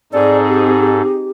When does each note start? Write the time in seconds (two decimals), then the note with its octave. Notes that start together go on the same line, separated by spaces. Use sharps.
0.13 G#2 C4 D#4 G#4 A4 D5
0.48 G4